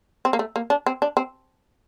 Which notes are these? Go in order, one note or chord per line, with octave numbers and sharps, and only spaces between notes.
C4
A#3
A3
A#3
D4
C4
D4
C4